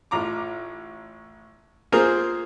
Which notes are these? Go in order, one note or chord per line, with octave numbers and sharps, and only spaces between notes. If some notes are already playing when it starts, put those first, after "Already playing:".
A1 F4 A#5 D6
A#3 F4 G#4 A#4 C5